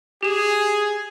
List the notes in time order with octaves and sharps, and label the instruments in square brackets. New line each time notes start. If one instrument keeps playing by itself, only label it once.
[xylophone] G4 E7 [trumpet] G#4